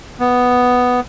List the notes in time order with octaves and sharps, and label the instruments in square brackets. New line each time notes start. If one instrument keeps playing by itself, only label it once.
[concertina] B3